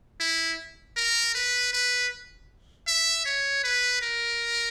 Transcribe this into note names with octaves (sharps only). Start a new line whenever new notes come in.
E4
A#4
B4
B4
E5
C#5
B4
A#4